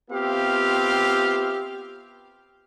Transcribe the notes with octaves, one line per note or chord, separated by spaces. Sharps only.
B3 C4 F4 G4 E5 F5